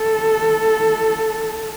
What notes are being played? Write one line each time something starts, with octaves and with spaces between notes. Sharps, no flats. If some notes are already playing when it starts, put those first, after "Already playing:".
Already playing: A4